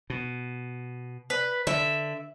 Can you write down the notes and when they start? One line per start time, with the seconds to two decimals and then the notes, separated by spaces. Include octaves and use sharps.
0.10 B2
1.30 B4
1.67 D3 E5